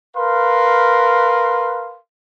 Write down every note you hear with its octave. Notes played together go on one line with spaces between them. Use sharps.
A#4 B4 F5 C6